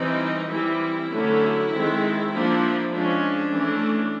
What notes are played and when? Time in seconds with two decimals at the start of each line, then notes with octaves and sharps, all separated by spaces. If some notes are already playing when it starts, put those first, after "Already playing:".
Already playing: E3 G3 C4 D#4
0.51 E3 G3 C4 E4
1.11 D3 F#3 A3 C#4
1.72 D#3 G#3 C4
2.32 F3 A#3 D4
2.91 F3 G#3 C#4 D4
3.52 E3 A3 C#4